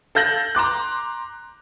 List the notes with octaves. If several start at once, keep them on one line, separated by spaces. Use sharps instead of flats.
A4 F5 G6 A#6 F#7
A#5 C6 D6 F#6